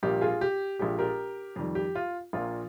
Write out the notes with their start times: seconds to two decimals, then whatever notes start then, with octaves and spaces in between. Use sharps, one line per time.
0.03 A#1 A#2 G3 A#3 G4
0.21 F4 G#4
0.41 G4
0.79 A#1 A#2 G#3 G4
0.99 G4 A#4
1.56 F2 D#3 G3
1.75 G4
1.95 F4
2.33 A#1 A#2 F3 A#3 F4